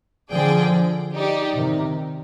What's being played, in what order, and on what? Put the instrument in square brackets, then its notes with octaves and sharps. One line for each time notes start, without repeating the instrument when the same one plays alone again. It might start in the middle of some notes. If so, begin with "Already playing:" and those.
[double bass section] D3 F3 [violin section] G#4 D5 G5
[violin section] D#4 G4 D5
[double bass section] C3 D#3